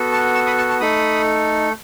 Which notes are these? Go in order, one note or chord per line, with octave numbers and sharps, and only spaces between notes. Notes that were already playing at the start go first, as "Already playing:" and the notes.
Already playing: B3 F#4 A4
A5 C#6
C#6 E6
B5 D#6
A5 C#6
A5 C#6
A3 D#4 A4 B5 D#6